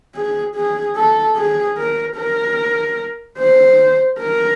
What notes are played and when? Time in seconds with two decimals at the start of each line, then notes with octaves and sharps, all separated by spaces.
0.15 G#4
0.56 G#4
0.96 A4
1.37 G#4
1.77 A#4
2.17 A#4
3.38 C5
4.19 A#4